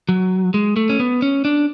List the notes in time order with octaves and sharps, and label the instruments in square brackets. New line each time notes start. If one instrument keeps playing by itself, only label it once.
[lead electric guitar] F#3
G#3
A3
C#4
B3
C#4
D4